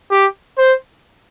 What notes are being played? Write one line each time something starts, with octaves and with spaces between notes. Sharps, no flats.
G4
C5